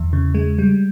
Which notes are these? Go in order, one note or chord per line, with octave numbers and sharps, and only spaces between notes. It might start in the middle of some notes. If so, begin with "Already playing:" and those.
Already playing: E2 E3
C#3
G#3
G3